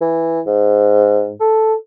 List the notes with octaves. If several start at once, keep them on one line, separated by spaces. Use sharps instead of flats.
E3
G#2
A4